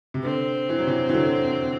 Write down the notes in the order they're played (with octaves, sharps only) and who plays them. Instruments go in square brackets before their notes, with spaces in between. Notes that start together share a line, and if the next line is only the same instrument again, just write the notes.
[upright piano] C3
[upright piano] D3 [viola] C4
[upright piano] E3
F#3
C3 E3
E3
D3 F#3